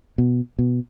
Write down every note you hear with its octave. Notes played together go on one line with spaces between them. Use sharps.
B2
B2